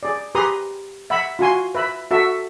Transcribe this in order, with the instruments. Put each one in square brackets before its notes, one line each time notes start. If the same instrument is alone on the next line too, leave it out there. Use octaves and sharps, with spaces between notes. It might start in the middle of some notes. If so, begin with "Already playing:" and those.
[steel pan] G#4 D5
G4 G#4 B4 A#5 C6 D#6
E5 F#5 B5
F4 F#4 G#5 C6
B4 E5 B5
F#4 A4 E5